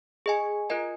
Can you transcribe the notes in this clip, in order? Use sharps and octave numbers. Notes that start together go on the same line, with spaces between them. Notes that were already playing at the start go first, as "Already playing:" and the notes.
G#4 D#5 G#5
F4 A#4 D#5 G#5